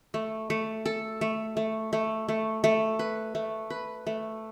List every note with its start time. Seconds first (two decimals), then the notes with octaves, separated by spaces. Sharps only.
0.14 A3
0.50 A3
0.86 A4
1.21 A3
1.57 A3
1.93 A3
2.28 A3
2.64 A3
2.99 B4
3.35 A3
3.70 B4
4.07 A3